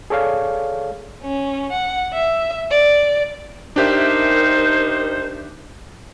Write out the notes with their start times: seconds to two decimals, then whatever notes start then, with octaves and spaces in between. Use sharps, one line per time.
0.10 G#4 A4 C#5 D5 F5
1.23 C#4
1.72 F#5
2.13 E5
2.71 D5
3.76 D4 D#4 G4 A#4 C5 E5